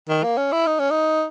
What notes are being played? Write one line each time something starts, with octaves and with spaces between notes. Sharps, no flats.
D#3
A#3
C#4
E4
D#4
C#4
D#4